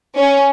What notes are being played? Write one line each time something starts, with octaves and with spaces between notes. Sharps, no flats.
C#4